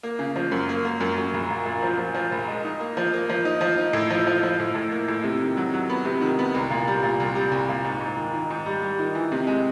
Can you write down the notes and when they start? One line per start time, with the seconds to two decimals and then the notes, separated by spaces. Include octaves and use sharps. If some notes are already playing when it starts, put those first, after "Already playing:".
0.03 A#3
0.19 C#3
0.36 F3
0.51 F#2
0.69 A#3
0.85 A#3
1.00 F#2
1.18 F#2
1.34 A#1
1.50 A#2
1.65 A#2
1.82 F3
1.98 F3
2.14 F3
2.32 A#1
2.48 G#3
2.64 D#4
2.80 A#3
2.97 F3
3.13 A#3
3.29 F3
3.45 D#4
3.61 F3
3.78 D#4
3.93 A2
4.10 F3
4.27 F3
4.43 F3
4.60 A2
4.75 A2
4.92 A#3
5.08 A2
5.24 C3
5.41 D#3
5.57 F#3
5.74 F#3
5.90 B3
6.05 C3
6.21 D#3
6.39 B3
6.54 C2
6.70 A#2
6.87 G3
7.03 A#2
7.20 C2
7.35 G3
7.51 C2
7.69 A#2
7.84 G#2
8.01 G#2
8.17 D#3
8.33 D#3
8.50 G#2
8.66 G3
8.82 G3
8.99 D#3
9.15 E3
9.32 C3
9.47 G#3